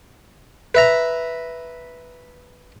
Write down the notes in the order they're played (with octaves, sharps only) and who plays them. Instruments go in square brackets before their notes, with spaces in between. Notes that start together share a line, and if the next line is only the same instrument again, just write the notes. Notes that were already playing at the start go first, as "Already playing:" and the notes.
[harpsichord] B4 E5 A#5